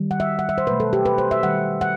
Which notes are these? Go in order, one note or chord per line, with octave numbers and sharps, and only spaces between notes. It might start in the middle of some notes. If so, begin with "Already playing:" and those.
Already playing: D#3 G3
F#5
E5
F#5
E5
C5
B2 F#3 A3 B4
A4
G4
B4
C5
E5
D#3 G3 F#5
F#5